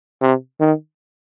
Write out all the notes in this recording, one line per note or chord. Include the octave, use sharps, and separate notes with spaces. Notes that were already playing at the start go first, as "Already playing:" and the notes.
C3
D#3